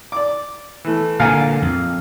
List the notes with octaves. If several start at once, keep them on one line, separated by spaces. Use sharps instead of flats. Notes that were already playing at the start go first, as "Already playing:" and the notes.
D5 D6
E3 A3
A#2 D3 F5 G#5 A#5
F2